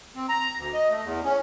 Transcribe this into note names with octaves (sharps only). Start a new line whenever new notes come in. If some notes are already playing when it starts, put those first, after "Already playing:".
C4
A#5
D2
D#5
A3
E2
C#4